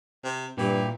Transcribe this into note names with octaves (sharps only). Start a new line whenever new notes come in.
C3
G2 A#2 E3 G4